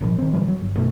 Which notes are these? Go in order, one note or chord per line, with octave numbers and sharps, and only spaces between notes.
G#1 A#2 D#3 F3
D#3 C4
A#2 D3 E3 G3
F#3
G1
F#2 B2 A3